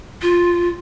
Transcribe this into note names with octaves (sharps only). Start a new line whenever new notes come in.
F4